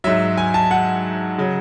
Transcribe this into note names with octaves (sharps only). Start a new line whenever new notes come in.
G#2 F#3 E5
G#5
A5
F#5
C#3 F#3